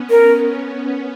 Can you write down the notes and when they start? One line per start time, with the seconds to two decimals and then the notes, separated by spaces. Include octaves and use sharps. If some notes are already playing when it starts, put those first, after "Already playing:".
Already playing: B3 C#4
0.10 A#4